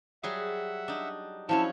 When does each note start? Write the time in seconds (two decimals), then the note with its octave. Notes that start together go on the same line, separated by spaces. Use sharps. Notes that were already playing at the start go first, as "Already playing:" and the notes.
0.23 F#3 G3 G#4 E5 F#5
0.88 D4 D#4
1.49 F3 F#3 C#4 D4 E4 C#5 A5